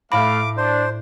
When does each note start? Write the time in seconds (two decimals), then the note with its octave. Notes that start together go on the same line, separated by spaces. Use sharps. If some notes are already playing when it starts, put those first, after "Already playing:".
0.12 A2 A3 F5 B5 D6 A#6
0.57 D4 C5